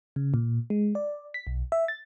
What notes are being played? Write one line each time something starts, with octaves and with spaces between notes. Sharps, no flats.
C#3
A#2
G#3
D5
B6
B1
E5
A6